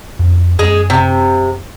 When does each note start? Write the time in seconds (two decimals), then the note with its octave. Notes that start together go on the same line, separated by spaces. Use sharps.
0.19 F2
0.59 F#2 G#3 C#4 G#4
0.90 C3